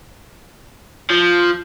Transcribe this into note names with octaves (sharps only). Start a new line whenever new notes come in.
F3